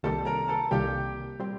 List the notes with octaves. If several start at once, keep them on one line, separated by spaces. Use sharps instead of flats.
C2 C3 D#3 G3 A#3 A4 A5
A#4 A#5
A4 A5
C2 C3 D#3 G3 A#3 G4 G5
A#2 G3 C4